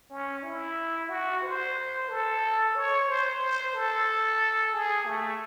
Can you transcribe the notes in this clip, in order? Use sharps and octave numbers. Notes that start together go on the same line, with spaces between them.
C#4
E4
F#4
C5
A4
C#5
C5
C5
A4
G#4
A3